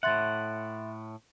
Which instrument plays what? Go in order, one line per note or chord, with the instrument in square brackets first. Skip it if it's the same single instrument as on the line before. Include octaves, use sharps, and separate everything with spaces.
[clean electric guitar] A2 F#5 [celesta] E5 C6 A6